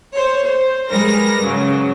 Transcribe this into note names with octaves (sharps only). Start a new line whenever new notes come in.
C5 C#5
C5
G3 G#3 A#4 B4 A#6
G#2 C#3 F#3